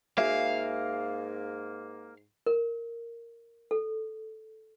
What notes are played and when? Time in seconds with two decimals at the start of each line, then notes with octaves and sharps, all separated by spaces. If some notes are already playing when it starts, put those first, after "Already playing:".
0.18 G#2 A#3 F#4 G#4 E5 F5
2.46 A#4
3.71 A4